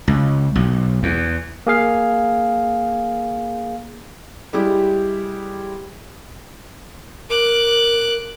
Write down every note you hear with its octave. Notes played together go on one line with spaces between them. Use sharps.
C#2
B1
E2
A#3 G#4 F5
G3 G#3 E4 G4
A#4 D6 F#6